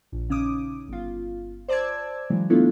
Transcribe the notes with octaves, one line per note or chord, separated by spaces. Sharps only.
A#1
C#3 C#4 D#4 D6 D#6
G1 F4
C5 D5 A5 D6 E6 G#6
C#3 E3 F#3 G#3
A3 B3 D4 E4 F4 A4